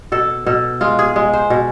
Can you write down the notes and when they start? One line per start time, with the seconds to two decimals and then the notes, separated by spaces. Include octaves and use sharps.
0.12 B2 A4
0.46 B2 A4
0.81 G#3 F4
0.99 G#4
1.16 G#3
1.33 C5
1.50 B2